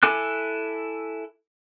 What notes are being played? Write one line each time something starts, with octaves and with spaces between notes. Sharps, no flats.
E4 A4 G#5 D6 F#6